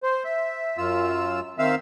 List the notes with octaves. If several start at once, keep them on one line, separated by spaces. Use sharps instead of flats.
C5
E5
F#2 F4 E6
D#3 C4 E5 F5 E6